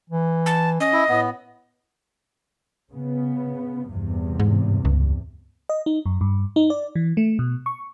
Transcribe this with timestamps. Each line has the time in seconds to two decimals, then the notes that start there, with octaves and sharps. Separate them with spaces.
0.10 E3
0.46 A5
0.80 C#4 D#5
0.93 E4
1.09 A2 B3
2.91 C#3 B3
3.89 E2 G2 C3
4.40 G#2
4.85 C#2
5.69 D#5
5.86 D#4
6.06 F#2
6.21 G2
6.56 D#4
6.70 D5
6.95 E3
7.17 A3
7.39 B2
7.66 C#6